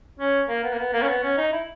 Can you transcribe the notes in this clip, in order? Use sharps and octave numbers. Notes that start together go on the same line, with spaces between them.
C#4
A#3
B3
A#3
B3
A#3
C#4
B3
C#4
D#4
E4